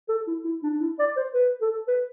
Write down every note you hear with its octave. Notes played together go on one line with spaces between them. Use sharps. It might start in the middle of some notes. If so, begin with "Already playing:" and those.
A4
E4
E4
D4
D4
E4
D5
C5
B4
A4
B4